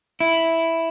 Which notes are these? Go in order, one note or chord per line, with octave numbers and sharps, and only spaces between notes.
E4